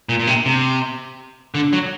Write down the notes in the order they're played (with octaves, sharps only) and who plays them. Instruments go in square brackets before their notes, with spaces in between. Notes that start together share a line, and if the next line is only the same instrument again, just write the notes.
[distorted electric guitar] A#2
A#2
C3
C3
D3
F#3